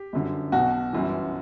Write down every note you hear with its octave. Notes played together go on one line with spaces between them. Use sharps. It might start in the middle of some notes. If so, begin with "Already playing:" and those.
Already playing: G4
G1 F#2 D3
B1 B2 F#4
G1 F#2 E3